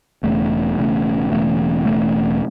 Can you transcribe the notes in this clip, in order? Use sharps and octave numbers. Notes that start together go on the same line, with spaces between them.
E1 E2 C#3 A3
E1 E2 C#3 A3
E1 E2 C#3 A3
E1 E2 C#3 A3